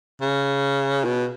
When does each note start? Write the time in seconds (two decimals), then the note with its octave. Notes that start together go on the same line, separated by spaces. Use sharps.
0.21 C#3
1.05 B2